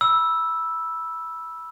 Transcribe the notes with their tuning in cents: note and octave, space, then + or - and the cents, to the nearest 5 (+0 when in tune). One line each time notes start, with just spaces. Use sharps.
B5 -20 E6 +0